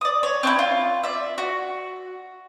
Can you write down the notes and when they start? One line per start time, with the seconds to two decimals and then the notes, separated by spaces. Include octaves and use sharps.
0.01 D5 D#6
0.23 C#5
0.43 C4 D#4 E4
0.59 F4
1.03 D5 E5
1.38 F#4